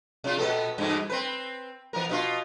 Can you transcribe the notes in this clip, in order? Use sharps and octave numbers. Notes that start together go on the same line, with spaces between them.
C3 F4
A#2 B3 A4
G2 B2 E3
C4 B4
E3 B3 A#4
B2 D#4 F4